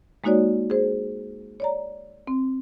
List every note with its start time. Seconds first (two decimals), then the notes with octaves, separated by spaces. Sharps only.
0.24 G#3 A#3 D#4 F#4 C#5 D5
0.70 G#4 C5
1.60 C#5 D5 A#5
2.27 C4